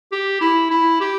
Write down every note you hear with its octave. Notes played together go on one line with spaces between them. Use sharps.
G4
E4
E4
G4